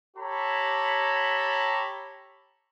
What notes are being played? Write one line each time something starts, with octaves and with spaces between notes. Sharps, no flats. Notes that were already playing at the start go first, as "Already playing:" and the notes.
G4 A4 C#5 A#5 B5